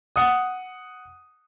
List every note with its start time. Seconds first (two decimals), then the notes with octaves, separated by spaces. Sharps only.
0.16 F#5 D#6